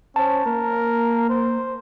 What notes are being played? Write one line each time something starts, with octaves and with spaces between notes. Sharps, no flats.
C#4 C5 A5
A#3 A#4
C5